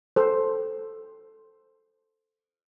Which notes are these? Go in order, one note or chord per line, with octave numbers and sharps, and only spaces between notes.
A4 C5